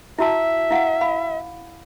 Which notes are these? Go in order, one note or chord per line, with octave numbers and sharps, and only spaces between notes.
E4 F#4 E5 A5
E4 F5 F#5
F5 B5